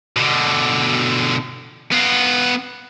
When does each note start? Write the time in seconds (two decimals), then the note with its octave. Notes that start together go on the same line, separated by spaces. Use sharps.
0.16 B2 D3
1.92 B3 F4